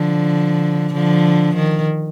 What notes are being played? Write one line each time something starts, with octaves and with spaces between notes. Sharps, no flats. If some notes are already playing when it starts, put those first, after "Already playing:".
Already playing: D3 F3
D3 F3
D#3